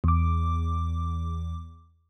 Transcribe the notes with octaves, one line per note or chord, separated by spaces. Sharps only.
E2 D6